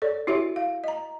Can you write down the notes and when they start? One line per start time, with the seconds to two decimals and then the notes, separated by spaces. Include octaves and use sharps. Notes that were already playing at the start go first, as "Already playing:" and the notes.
0.02 A4 C#5 D5
0.27 E4 F#4 G4 C#5 E5
0.56 F5
0.84 D#5 A#5